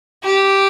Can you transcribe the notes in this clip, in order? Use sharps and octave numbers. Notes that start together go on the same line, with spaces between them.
G4